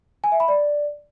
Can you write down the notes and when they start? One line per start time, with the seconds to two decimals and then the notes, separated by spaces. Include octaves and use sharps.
0.24 G#5
0.32 E5
0.40 B5
0.48 D5